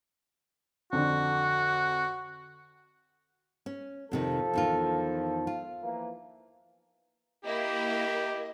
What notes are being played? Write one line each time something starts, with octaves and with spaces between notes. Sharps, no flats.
F2 D3 F#4
C#4
F2 C3 D#3 F3 A4
E2 D#3 F4
F4
E3 F3 A#3
A#3 E4 G4 D#5